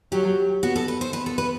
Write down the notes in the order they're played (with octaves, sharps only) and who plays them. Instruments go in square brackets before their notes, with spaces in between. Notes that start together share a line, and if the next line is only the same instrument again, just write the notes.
[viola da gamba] F#3 [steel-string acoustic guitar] G4
[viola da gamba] B3 [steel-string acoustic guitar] F#4
[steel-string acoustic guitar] A4
B4
C5
[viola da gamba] B3 [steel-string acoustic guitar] B4
[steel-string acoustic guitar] A4
B4